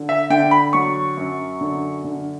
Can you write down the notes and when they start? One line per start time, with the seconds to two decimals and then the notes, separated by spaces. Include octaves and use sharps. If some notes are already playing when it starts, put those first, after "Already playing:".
Already playing: D3
0.09 E5
0.30 D3 G5
0.51 B5
0.73 F#3 C#6
1.17 F#2
1.61 D3
2.04 D3